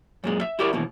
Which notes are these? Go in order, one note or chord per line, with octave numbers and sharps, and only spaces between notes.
F#2 A#2 G#3
E5
E4 F#4 G4 A#4 D5 E5
D#2 B2 E3